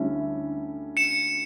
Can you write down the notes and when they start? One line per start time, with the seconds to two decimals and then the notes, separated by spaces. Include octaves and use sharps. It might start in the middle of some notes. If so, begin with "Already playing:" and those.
Already playing: D2 D3 G3 C#4 E4
0.97 C#7 E7